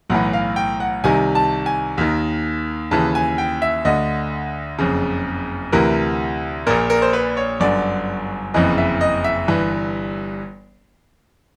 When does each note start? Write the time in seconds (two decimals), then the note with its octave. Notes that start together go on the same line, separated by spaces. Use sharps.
0.10 B1 A2 E3 F#5
0.33 F5
0.56 G5
0.80 F#5
1.04 C2 C3 D#3 G#5
1.35 A5
1.66 G#5
1.98 D#2 D#3
2.91 D#2 C#3 E3 A5
3.15 G#5
3.38 G5
3.62 E5
3.85 D2 D3 D#5
4.79 F#1 F2 C#3
5.72 D2 C3 E3 A#4
6.67 A#1 A#2 A#4
6.90 A#4
7.02 C5
7.13 B4
7.37 C#5
7.60 G1 F#2 D3 D5
8.54 F#1 F2 C#3 E3 D#5
8.78 E5
9.01 D#5
9.24 E5
9.48 G1 G2 E3